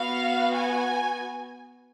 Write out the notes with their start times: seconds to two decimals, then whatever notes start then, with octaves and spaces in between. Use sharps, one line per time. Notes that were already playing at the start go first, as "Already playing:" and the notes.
Already playing: B3 F#4 F5
0.54 G#5